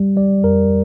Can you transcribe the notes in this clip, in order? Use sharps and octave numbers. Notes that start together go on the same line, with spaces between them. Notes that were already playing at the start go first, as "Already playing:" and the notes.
Already playing: G3
G3 D5
F2 A#4